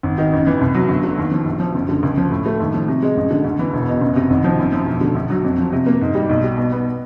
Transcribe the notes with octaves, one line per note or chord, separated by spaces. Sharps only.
G#1
D#3
A1
E3
C2
F#3
G1
D3
D#2
F3
A#1
F3
F#1
D3
C#2
F3
A2
A3
D#2
F3
C3
G#3
A1
D3
D2
E3
E1
B2
F#1
C3
G#1
F3
F#2
F3
E1
D3
A#1
F#3
F2
F3
C3
A#3
G#2
G3
B1
G3
B2
B3